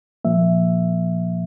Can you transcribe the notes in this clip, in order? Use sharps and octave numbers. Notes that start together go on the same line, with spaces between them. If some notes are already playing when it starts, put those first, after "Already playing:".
A#2 F3 A#3 E5